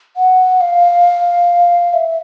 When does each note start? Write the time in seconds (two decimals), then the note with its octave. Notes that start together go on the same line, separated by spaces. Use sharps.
0.17 F#5
0.61 F5
1.93 E5